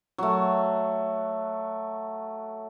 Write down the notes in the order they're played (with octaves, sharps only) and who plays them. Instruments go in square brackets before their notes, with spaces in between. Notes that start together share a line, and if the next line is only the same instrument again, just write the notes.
[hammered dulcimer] F#3 A3